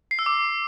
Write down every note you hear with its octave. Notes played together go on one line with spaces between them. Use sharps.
C7
E6
D6